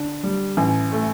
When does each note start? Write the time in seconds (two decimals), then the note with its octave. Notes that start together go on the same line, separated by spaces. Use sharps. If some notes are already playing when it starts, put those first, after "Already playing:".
Already playing: D3 D4
0.23 G3
0.57 A1
0.92 A3